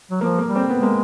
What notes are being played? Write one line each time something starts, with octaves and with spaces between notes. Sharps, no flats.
F#3
F3 A#3
A#3
G3
C4
G#3 B3
A#3